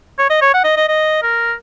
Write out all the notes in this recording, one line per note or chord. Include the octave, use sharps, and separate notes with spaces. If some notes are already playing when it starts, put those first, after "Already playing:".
C#5
D#5
C#5
F#5
D#5
D#5
D#5
A#4